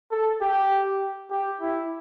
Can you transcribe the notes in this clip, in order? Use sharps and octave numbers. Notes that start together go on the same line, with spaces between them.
A4
G4
G4
E4